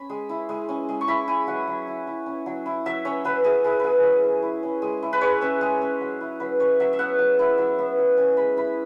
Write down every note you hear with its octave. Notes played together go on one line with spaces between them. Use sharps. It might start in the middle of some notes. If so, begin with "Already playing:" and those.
Already playing: C#4 B5
G#3
E4
G#3
C#4
G#3
C#6
E4 B5
E4 G#5
F#3 F#5
F#3
E4
E4
C#4
F#3
E4
F#3 E5
C#4 C#5
F#3 B4
E4 G#4
E4 G#4
F#3 G#4 B4
F#3
E4
E4
C#4
G#3
E4
B4
G#3 C#5
C#4 E5
G#3 G#4
C#4
F#3
E4
F#3 B4
C#4 C#5
F#3 E5
E5
B3 F#5
F#3
E4
F#3
B3
F#3
C#4 G#5
G#3 B5
E4 B5